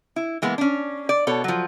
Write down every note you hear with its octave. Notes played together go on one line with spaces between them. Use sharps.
E4
E3 G#3 A#3 B3
C#4 D4
D5
B2 A4 C#5
F3 F#3